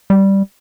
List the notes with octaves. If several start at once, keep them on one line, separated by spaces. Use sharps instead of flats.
G3